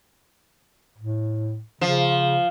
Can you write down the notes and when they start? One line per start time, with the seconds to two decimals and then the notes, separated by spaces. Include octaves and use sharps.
0.98 A2
1.81 C#3 F3